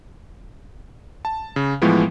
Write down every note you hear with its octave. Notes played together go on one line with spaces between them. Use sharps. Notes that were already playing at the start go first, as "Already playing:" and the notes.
A5
C#3
A2 E3 F3 G#3 B3